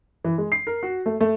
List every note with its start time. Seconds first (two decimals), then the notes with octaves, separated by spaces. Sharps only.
0.24 E3
0.38 G#3
0.52 C7
0.67 A#4
0.83 F#4
1.06 A3
1.21 A3